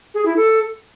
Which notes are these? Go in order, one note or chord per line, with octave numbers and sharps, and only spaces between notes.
G#4
E4
A4